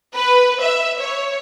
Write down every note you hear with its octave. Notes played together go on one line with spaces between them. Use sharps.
B4
E5
C#5